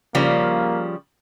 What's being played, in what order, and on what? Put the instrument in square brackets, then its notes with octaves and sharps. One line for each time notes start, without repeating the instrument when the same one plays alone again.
[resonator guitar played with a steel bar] C#3 F3 G3 [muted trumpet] A#3